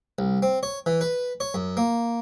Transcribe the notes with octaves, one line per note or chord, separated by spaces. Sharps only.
C2
C4
C#5
E3
B4
C#5
F#2
A#3